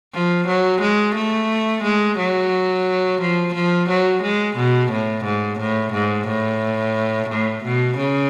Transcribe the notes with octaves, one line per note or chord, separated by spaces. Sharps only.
F3
F#3
G#3
A3
G#3
F#3
F3
F3
F#3
G#3
B2
A2
G#2
A2
G#2
A2
A2
B2
C#3